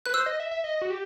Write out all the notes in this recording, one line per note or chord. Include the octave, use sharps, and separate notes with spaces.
B4 F#6
C5 E6
D#5
E5
E5
D#5
F#4
G4